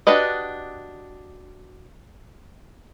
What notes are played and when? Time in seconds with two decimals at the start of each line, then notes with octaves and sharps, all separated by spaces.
0.07 D4 F#4 G4 B4 D#5